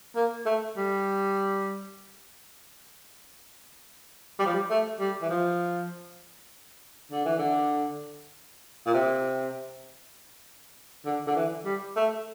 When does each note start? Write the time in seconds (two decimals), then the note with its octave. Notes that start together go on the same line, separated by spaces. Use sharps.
0.16 A#3
0.46 A3
0.77 G3
4.39 G3
4.46 F3
4.53 G3
4.70 A3
4.99 G3
5.22 E3
5.29 F3
7.12 D3
7.25 E3
7.38 D3
8.86 A#2
8.94 C3
11.05 D3
11.27 D3
11.36 E3
11.65 G3
11.96 A3